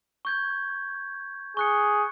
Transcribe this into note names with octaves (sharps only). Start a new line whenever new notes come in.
C#6 G6 G#6
G#4 C#6 F#6 C#7